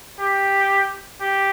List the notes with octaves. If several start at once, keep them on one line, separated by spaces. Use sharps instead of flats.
G4
G4